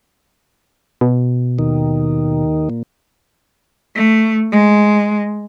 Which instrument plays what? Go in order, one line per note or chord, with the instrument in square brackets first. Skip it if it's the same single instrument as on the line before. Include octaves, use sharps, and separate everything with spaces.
[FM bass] B2
[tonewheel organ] D#2 D#3
A#2
[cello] A3
G#3